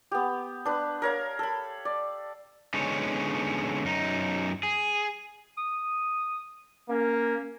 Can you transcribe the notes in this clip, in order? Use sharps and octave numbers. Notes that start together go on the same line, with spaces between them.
B3 G4
D4 B4
A#4 C#5 F5
A4 B5
D5
D3 G#3 B3 C#4 D#4 C#5
F#2 D#4
G#4
D#6
A#3 C#4